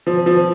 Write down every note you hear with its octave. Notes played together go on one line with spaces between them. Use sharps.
F3
F3